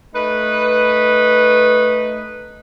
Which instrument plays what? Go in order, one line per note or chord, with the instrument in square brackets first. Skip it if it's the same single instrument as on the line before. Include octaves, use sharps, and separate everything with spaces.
[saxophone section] A3 D#4 B4